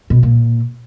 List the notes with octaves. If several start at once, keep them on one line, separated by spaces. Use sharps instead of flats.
B2
A#2